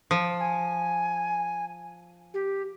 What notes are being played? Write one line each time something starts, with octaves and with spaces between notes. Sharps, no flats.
F3
G#5
G4